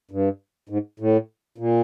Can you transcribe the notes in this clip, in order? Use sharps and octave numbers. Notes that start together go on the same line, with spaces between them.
G2
G#2
A2
A#2